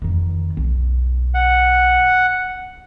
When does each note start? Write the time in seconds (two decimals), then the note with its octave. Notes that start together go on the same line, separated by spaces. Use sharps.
0.02 F2 D#3
0.57 B1
1.34 F#5